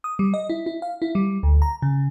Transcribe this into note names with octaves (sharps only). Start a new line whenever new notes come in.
D#6
G3
D#5
E4
E4
F5
E4
G3
D2
A#5
C#3